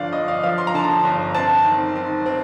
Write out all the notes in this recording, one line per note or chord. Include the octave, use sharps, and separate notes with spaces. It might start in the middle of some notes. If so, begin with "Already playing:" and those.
Already playing: G1 D3 F3 D5 F5
G1 D#5
F5
F3 F5
C6
A#5
D3 A5
A#5
G1
C4 A5
D#3
D#3
C4